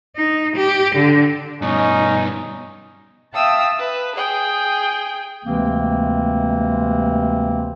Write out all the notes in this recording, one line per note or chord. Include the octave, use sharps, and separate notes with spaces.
D#4
G4
D3
G2 B2 C#4 D#4
E5 F5 G5 A5 D#6 E6
B4
G#4 G5
D2 C3 E3 G#3 A#3 C4